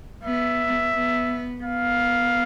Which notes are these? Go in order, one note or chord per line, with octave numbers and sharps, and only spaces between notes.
B3 E5
B3
B3 F5